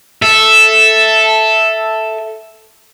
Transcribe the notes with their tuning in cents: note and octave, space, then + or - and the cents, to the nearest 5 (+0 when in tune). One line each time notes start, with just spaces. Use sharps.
A4 +0 E5 +0